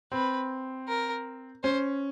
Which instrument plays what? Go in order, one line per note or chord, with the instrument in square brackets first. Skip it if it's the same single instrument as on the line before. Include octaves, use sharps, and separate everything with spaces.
[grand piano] C4 [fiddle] B4
[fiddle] A#4
[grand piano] C#4 [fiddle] C5